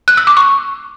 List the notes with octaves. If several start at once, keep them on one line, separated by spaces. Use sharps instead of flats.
F#6
E6
D6
C#6